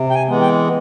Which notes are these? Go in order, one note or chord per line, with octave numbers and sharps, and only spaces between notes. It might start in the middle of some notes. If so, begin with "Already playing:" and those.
Already playing: C3
G5
G#5
E3 G#3 B3
G5